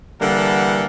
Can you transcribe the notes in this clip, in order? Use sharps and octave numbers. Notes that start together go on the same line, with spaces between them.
D3 E3 G3 A#3 A4 F#5